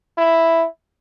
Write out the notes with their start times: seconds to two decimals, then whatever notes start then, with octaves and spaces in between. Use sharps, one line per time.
0.18 E4